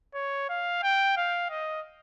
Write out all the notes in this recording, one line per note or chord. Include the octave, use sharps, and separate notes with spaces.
C#5
F5
G5
F5
D#5